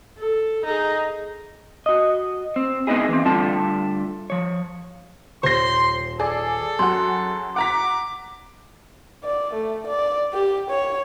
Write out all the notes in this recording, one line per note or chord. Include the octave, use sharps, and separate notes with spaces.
A4
D#4 G#4
F#4 D#5
C4
G#3 B3 C#4 D#4 E4 G#4
E3 C4
D3 G3 A3 F4 A5
F3 C#5
D#1 C5 C6 A#6
G#4 A4 D5
F#2 F#4 G#4 F#5 C6
F#5 A#5 D6 B6
D5
A3
D5
G4
C#5